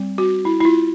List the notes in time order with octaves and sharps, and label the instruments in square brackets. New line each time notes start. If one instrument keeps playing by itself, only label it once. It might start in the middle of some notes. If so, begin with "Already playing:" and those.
Already playing: [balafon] G3 C4
F#4
E4
E4
F4